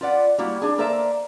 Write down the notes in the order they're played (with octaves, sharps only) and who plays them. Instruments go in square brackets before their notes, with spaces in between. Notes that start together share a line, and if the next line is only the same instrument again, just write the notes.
[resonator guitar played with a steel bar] F4 B4 D5 F#5
G3 A#3 E4 F#4
D4 G#4
A#3 A4 A#4 C5 D5 E5